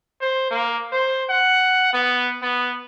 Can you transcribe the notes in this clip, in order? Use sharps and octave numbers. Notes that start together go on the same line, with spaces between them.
C5
A#3
C5
F#5
B3
B3